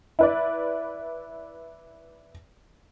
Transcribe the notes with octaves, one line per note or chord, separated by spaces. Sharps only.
E4 B4 D5